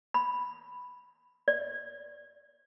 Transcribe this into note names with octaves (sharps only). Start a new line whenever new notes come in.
B5
D5